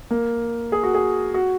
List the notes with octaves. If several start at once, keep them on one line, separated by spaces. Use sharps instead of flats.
A#3
G#4
F#4
G#4
F#4